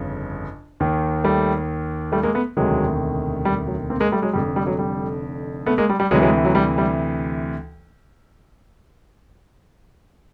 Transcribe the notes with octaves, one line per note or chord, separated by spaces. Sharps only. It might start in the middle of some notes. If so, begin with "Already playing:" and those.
Already playing: G1 F2 C#3
D#2 D#3
G3 A3
G3 A3
G#3 A#3
A3 B3
E1 D2 C3 D#3 F#3 G#3
G3
F#3
A#3 C4
G#3 A#3
G3 A3
F#3 G#3
F1 F2 D3 G3
G3
F#3
G3
A3 B3
G#3 A#3
G3
G3
D2 C3 E3 F#3 G#3
F#3 G#3
F#3
G3
G3